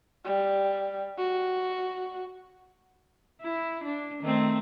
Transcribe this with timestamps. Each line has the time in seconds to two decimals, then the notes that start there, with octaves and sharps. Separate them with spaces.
0.24 G3
1.18 F#4
3.42 E4
3.84 D4
4.21 D#3 A3 C4